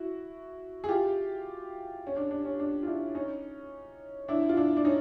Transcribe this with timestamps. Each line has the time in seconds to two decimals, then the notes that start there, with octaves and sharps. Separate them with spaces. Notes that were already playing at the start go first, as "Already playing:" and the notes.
Already playing: E4 F#4
0.84 G#4
0.88 F4 G4
2.07 C#4
2.16 D4
2.31 D4
2.45 C#4
2.59 D4
2.83 F4
2.87 D4 E4
3.15 C#4 D#4
4.28 D4 E4
4.49 F4
4.57 D4 E4
4.77 D4
4.85 C#4 D#4